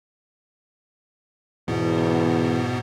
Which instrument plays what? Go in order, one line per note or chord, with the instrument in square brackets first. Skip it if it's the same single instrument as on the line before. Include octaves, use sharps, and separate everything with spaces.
[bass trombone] E2 [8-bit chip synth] G#2 B2 B3